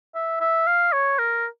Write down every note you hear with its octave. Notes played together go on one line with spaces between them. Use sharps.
E5
E5
F5
C#5
A#4